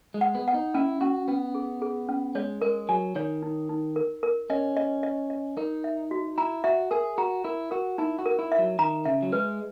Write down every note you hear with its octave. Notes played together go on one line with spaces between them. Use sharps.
G#3
F#5
B3
F#5
D#4
C#4 E4
C#4 F#4
B3 C#4
G#4
G#4
C#4
G#3 C#5
G#3 A#4
F#3 G#5
D#3 C#5
D#4
D#4
A#4
A#4
C#4 D#5
D#5
D#5
D#5
D#4 A#4
E5
F#4
E4 A#5
F#4 E5
G#4 A#4
F#4 A#5
E4 A#4
F#4 A#4
D#4 E4
F#4
A#4
E4
E5
F#3
D#3 A#5
C#3 E5
F#3
G#3 B4